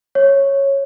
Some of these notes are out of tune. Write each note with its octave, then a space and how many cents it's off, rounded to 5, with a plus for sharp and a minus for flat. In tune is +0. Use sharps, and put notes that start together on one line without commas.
C#5 -5